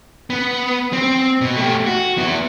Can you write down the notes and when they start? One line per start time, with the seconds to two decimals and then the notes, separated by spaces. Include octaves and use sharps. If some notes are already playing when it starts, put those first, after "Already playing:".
0.30 B3
0.93 C4
1.41 B2
1.56 A3 G4
1.86 F#4
2.18 B3 E4